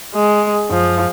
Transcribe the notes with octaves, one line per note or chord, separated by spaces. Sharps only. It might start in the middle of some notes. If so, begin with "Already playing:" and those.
G#3
F#2 F3